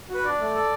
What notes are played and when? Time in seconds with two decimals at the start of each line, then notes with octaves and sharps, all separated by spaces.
0.09 F#4 B4
0.25 D4 D5
0.39 A3
0.55 A4